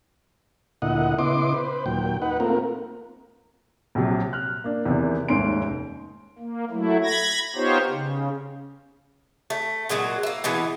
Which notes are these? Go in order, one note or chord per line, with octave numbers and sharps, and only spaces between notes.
D2 A#2 E4 D#5 F#5
C#3 B3 E4 D#5 C6 D6
B4 C5
D#2 A#2 F#3 G5
D#4 B4 F#5
A3 A#3 C4 F4 A#4
A#1 C3 F#3
F6 F#6
A#3 D4
E2 C3 D#3
F1 D#2 G#2 C#4 C6 D7
A#3
F#3 A3 E4
B5 G#6 A#6
B3 D#4 F4 G4 C5 C#5
C#3
A3
A#2 F#3 G#3 F#4
A#3 E4
B2 E3 G#3 B3